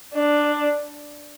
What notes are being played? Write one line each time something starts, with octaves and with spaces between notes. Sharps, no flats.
D4